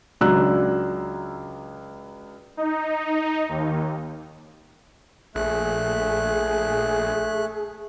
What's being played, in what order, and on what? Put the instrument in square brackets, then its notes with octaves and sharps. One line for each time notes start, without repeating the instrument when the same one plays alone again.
[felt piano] C#2 F#3 D4 A#5 E6 F#6
[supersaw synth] D#4
D#2
[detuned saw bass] A#1 [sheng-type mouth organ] A3 F#6 [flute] G#4